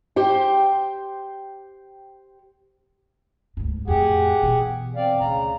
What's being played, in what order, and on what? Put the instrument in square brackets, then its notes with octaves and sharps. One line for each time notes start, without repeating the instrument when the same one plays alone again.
[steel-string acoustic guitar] G4 C5 G5
[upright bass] D2 G#2
[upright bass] F2 A2 [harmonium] G4 G#4 F#5
[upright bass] B2 E3
[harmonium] C4 D5 F5
[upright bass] D2 [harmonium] C#3 A#5